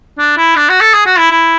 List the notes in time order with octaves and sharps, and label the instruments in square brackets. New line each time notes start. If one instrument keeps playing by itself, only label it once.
[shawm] D4
E4
D4
F#4
A4
G#4
F#4
E4
E4